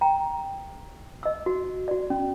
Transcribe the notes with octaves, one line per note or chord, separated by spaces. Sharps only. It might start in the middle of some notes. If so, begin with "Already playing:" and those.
G5 A#5
D#5 E6
F#4
F#4 D5
C#4